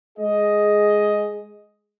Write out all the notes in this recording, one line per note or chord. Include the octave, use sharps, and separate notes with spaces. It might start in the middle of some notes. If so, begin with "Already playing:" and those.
G#3 G#4 D#5